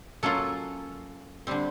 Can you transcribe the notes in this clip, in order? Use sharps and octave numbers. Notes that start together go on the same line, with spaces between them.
F#3 A#3 C#4 F4 A4
D3 G3 C4